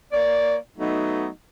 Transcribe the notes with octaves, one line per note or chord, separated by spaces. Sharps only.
A#3 C#5 D5
F#3 A3 B3 D#4